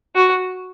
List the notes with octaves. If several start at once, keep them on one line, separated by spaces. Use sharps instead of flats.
F#4